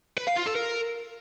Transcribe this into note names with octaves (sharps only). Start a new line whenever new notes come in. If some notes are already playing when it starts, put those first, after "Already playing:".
B4
F5
F4
A4
A#4